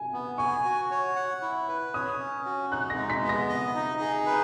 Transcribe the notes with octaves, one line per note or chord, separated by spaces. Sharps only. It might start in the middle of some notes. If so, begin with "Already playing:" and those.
Already playing: G#5
B3
G#5 C#6
F#4
C#5
F#5
E4
B4
C#5 D#6
C#4
F#4
D#4 F#6
A#6
G#3
B6
B3
A#6
D#5
D#4
G#4
B4